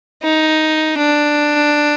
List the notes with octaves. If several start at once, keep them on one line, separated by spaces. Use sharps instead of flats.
D#4
D4